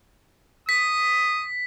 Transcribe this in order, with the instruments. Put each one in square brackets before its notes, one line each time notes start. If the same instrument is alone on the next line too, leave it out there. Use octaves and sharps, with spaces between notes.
[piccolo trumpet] D#6 [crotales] B6